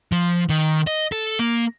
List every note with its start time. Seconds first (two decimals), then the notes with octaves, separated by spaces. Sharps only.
0.12 F3
0.49 D#3
0.87 D#5
1.12 A4
1.39 A#3